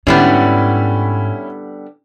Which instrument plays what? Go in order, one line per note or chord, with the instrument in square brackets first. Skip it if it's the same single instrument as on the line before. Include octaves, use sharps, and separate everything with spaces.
[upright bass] G#2 [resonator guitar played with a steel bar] D3 G3 B3 [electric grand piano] C#4 E4 B5